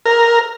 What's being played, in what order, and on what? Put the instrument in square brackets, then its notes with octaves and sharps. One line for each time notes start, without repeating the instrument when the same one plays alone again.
[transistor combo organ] A#4